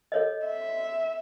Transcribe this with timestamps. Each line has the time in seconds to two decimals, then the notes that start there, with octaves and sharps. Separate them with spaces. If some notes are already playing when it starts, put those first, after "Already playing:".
0.12 A4 C#5 D#5
0.46 E5